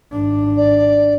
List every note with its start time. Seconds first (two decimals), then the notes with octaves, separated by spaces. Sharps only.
0.12 G#1 D4
0.57 D5